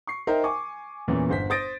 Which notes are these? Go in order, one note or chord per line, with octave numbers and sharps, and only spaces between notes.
C#6 C7
D#4 A#4 C5 E5 G5
G#5 C#6 D6
E2 A#2 E3 C#4
G1 C5 B6
C5 D#6 A6 A#6 D7